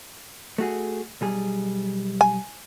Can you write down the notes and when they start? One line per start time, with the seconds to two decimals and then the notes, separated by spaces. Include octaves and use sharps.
0.58 A3 F#4 G#4
1.21 B1 G3 G#4
2.21 G#5